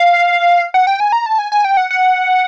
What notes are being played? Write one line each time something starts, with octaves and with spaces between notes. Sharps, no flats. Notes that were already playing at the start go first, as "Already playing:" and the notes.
Already playing: F5
F#5
G5
G#5
A#5
A5
G#5
G#5
G5
F#5
F#5